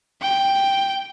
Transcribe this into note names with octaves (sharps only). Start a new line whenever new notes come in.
G5